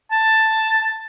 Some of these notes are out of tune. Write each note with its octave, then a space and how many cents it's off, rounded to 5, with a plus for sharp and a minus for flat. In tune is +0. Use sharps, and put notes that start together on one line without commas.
A5 +5